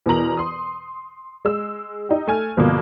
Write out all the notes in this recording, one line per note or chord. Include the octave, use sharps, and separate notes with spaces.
E2 B2 A#4 A#5 F#7
C6 D#6
G#3 E6
D#4 G4
A3 G#5 F6
G2 B2 D3 F3 A#3